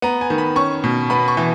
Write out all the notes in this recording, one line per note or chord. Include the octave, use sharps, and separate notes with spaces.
B3 A#5
G#5
D#3
B5
C#4 C#6
B2
B3 B5
C#6
E3